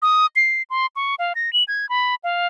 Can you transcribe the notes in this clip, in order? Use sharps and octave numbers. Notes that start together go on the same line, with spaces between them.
D#6
C7
C6
C#6
F5
A#6
F#7
G#6
B5
F5